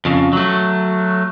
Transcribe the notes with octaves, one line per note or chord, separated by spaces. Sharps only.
F2 C#3
F#3 A3